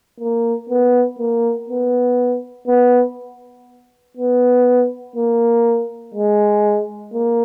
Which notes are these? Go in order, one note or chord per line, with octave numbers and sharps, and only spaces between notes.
A#3
B3
A#3
B3
B3
B3
A#3
G#3
A#3